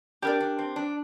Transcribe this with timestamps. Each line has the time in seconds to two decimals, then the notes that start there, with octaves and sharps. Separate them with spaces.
0.22 D4 G4 A#4 D5
0.40 D4
0.59 C4
0.76 D4